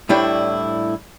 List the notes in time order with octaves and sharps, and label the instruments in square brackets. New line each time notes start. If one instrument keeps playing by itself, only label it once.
[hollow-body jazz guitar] A2 G3 D4 E4 C5 C#5